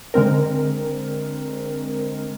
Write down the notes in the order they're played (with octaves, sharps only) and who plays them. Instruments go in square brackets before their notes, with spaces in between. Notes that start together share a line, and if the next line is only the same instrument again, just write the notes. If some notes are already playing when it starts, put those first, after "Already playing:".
[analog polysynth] D3 G#3 C4 A#4